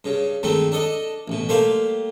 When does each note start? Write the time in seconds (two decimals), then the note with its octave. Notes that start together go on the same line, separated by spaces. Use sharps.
0.04 G2 C#3
0.43 G2 D#3 G#3 A3 C4
0.72 D4 A4 D#5
1.28 A1 B2
1.49 G3 A3 A#3 C5 F5